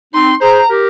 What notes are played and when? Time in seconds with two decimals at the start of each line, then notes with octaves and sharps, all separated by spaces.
0.13 C4 D#4 C6
0.42 G#4 C5 A#5
0.70 G4 A#4